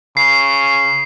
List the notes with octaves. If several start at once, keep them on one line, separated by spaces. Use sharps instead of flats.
C#3 C7